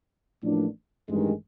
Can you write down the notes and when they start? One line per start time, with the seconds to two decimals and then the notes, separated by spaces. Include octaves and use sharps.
0.43 A1 A2 F3 A#3 D4
1.09 A1 G2 D#3 G#3